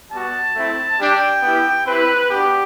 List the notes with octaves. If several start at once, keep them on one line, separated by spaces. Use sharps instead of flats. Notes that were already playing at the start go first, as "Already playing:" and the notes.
G3 B3 F#4 A5
A3 C4 E4
G3 D4 G4 G5
B3 E4 G4
C4 E4 G4 B4
B3 D4 F#4 G4